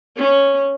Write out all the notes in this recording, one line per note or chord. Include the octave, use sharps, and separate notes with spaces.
C#4